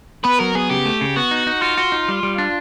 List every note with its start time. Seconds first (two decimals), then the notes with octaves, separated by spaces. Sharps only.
0.24 B3 B4
0.39 F#3 A#4
0.55 B3 G#4
0.69 C#3 G4
0.85 A3
1.01 C#3
1.16 B3 F#4
1.31 D#4
1.47 D#4
1.62 F4 F#4
1.77 F#4
1.92 D#4
2.08 G3
2.23 G3
2.38 D4